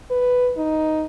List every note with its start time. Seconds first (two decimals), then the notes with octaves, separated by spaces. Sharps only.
0.10 B4
0.57 D#4